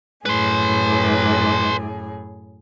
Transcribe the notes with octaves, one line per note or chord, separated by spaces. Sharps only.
F#2 A2 G#4 B4 C6